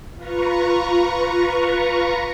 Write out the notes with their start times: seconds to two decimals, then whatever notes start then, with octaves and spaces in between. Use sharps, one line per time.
0.17 F4 B4 A#5 C#6